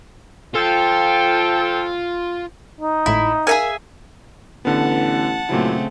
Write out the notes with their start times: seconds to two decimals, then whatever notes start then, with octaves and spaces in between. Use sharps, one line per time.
0.55 F3 F4 A4 G5
2.81 D#4
3.06 G#1 A2 E4
3.47 G#4 A#4 E5 F5 G#5
4.65 A1 D3 B3 F#5 A5
5.49 A#2 C#3 F#3 A3 C4 E4